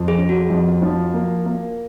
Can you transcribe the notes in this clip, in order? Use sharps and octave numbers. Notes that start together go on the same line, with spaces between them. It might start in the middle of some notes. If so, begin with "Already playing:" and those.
Already playing: F2
G#4
C#4
F#4
F2
F3
A#3
A#3